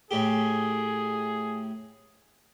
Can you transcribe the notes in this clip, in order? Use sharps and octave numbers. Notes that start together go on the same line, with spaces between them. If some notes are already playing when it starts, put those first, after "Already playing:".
A2 A3 G4 G#4